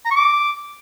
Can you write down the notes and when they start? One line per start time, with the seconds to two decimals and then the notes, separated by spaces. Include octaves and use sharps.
0.05 A#5
0.11 C#6
0.16 D6